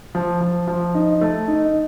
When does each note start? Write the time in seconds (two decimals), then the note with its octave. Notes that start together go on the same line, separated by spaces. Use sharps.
0.15 F3
0.41 F3
0.67 F3
0.94 D#4
1.21 A3
1.48 D#4